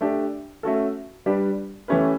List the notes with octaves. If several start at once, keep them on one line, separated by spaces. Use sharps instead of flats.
A3 D4 G4
A3 C#4 F#4 A4
G3 D4 G4 B4
E3 A3 C#4 G4 B4